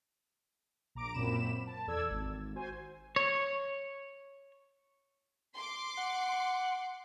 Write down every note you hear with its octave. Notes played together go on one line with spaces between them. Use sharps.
A#1 A#5 D6 D7
F#2 A#2 C4 B5 E7
A5
E2 A4 D5 E6 G#6
G#1
F#4 C5 G#5
C#5
C6 D6
F#5